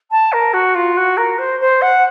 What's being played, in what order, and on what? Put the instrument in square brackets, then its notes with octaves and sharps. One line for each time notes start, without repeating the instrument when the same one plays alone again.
[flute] A5
A#4
F#4
F4
F#4
A#4
C5
C5
F#5